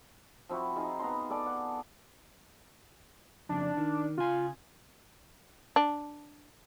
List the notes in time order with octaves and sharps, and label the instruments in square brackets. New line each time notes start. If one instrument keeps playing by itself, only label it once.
[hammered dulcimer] F3 C4 E4 F#4
D#4 F4 G#4 A5
B3 A#5 C6
G#4 A4 D5 A5
F#5
[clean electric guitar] F2 C#3 [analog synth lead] D4
[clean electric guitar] D#3
[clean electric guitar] C#3 G#5 [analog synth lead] F4
[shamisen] D4